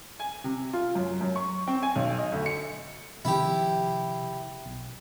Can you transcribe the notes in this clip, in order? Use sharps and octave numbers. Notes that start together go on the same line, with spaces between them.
G#5
C3
F4
F#2
F#2
C#6
C4
G#5
B1
D#5
D2
C#7
C3 D#3 F3 E4 G4
B1